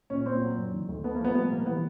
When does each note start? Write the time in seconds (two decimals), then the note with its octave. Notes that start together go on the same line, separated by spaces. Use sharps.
0.10 A#2 C#4
0.26 A#2 C4
0.42 F#3
0.57 F#2
0.73 D#3
0.89 D2
1.04 A3 B3
1.15 A#3
1.20 F3 B3
1.35 G3 B3
1.51 B2 A#3
1.66 E3 B3